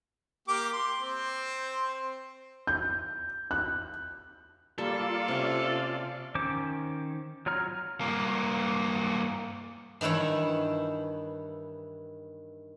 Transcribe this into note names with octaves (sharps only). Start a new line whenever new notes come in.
A#3 G4 D6
C6
C4 C5
G6
F#6
G3 A#3 F4 A4 D5 F5
C3 C#4
D#3 C#4 C5 D6
F#3 F4 C#5 A#5 F6
G2 A#3
G2 D#3 E3 E4 C#5